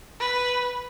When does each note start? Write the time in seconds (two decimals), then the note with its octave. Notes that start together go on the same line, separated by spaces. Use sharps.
0.20 B4